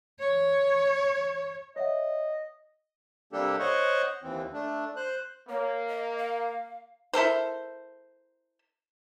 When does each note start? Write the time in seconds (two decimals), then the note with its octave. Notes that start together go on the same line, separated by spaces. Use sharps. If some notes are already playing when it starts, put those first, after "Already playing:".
0.19 C#5
1.76 C#5 D#5 E5 F#5
3.33 C3 G3 A#3 D4 G4 A4
3.59 C5 C#5 D#5 F#5 C#6
4.23 D#2 E3 C4
4.54 A3 D4
4.96 C5 F#6
5.49 A#3 C#5
5.88 D#5
6.18 F5
7.13 E4 A4 A#4 C5